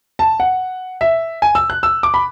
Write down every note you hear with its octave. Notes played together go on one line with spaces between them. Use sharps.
A5
F#5
E5
G#5
E6
F#6
E6
D6
B5